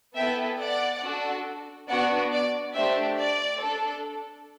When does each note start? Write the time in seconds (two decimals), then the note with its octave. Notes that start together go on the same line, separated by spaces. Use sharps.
0.16 B3 E4 A4 E5 G5
0.59 D5 F#5
1.02 D4 F#4 A4
1.88 B3 D4 F#4 D5 F#5
2.32 D5
2.74 A3 D4 G4 C5 E5
3.18 D5
3.61 D4 A4